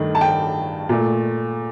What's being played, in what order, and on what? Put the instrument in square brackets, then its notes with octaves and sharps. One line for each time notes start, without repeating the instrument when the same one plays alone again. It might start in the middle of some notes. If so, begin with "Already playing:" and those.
Already playing: [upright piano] G2 D#3 A3
A5
G5
A#2 A3